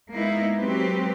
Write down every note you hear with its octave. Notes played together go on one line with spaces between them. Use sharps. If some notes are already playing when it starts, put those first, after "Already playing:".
G#3 A#3 B3 D#4 E4
F#3 G#3 A#3 C4 G4 B4